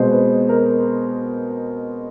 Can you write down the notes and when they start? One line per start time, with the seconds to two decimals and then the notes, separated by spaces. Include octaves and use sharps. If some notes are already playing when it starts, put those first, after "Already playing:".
Already playing: B2 G#3 C4 C5
0.11 B4
0.49 A#4